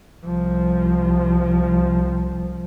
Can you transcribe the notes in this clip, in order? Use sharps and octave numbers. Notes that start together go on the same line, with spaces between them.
C2 F3